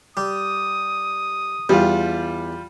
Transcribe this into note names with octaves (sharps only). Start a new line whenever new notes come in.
G3 D#6
E2 G3 F4